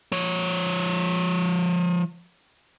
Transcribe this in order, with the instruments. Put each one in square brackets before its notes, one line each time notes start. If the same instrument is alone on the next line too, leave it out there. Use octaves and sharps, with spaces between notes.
[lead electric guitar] F3 C#5